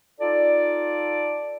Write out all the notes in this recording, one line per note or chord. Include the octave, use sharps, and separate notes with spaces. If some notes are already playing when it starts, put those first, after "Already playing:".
D#4 F4 A4 D5